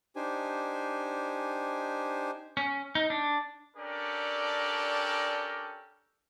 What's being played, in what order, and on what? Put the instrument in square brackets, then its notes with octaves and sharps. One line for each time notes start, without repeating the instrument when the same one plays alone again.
[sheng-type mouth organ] D4 D#4 G4 C5 G#5
[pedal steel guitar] C#4
D#4
D4
[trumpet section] C#4 D4 G4 A4 A#4 D5